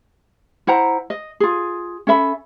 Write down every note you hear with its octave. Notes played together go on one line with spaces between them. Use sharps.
E4 C5 F#5 A#5
D#5
F4 G#4
C#4 A4 E5 B5